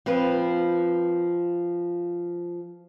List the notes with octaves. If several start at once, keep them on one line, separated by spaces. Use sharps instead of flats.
F3 C4 F4 B4